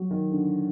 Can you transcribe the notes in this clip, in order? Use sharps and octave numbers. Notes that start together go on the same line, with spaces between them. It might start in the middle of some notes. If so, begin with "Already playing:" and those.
Already playing: F#3
D#3
D3